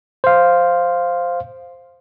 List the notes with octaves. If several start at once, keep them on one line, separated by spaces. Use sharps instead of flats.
C5 F5